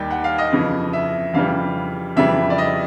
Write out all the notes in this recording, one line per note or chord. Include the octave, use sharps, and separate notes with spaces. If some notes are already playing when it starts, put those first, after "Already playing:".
Already playing: D#2 D#3 G3 G5
F#5
F5
D#5
F2 C#3 E3
E5
F2 C#3 E3 G3 F5
F2 C#3 E3 G3 E5
D5
D#5